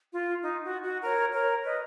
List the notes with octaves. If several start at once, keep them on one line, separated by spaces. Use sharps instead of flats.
F4
D#4
F#4
F#4
A#4 C#5
A#4 C#5
B4 D#5